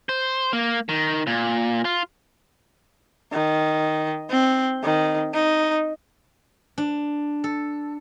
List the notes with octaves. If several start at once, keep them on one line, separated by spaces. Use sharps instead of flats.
C5
A#3
D#3
A#2
F4
D#3
C4
D#3
D#4
D4
A4